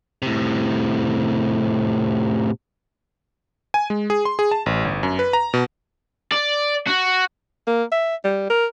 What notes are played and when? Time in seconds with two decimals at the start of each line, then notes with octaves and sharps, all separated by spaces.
0.22 A2 C3
3.74 G#5
3.90 G#3
4.10 G#4
4.25 C6
4.39 G#4
4.51 A5
4.66 A1
4.85 G1
5.03 F#2
5.19 B4
5.33 A#5
5.54 B2
6.32 D5
6.87 F#4
7.67 A#3
7.92 E5
8.24 G3
8.50 A#4